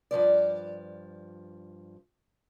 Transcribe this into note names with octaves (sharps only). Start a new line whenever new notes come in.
G2 D#3 F3 D5